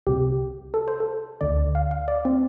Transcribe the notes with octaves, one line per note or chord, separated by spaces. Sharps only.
C2 C3 G4
A4
C5
A4
D2 D3 D5
F5
F5
D5
C4